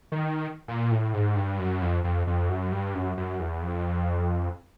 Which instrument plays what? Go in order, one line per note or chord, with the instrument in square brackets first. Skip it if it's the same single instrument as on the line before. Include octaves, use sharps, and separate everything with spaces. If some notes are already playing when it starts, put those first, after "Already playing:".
[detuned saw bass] D#3
A#2
A2
G#2
G2
F#2
F2
F2
F2
F#2
G2
F#2
F#2
E2
F2